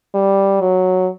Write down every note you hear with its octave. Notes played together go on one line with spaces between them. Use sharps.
G3
F#3